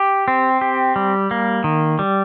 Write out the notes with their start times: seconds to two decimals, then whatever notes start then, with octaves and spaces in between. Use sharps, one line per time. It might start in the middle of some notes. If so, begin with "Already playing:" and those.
Already playing: G4
0.28 C4
0.61 G4
0.96 G3
1.31 A#3
1.64 D#3
1.99 G3